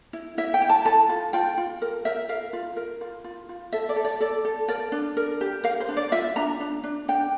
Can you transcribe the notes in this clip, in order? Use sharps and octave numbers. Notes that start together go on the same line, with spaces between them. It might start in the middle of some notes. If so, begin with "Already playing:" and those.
E4
E4 E5
G5
E4
A5
A4 A5
F4
F4 G5
F4
A#4
A#4 E5
A#4 F5
F4
A#4
F4
F4
F4
A4 E5
D5
A4
D5
A4 D5
A4
A#4 D5
D4
A#4
G4
A#4 F5
C5
D4
D5
F4 E5
D4 A#5
D4
D4
D4 G5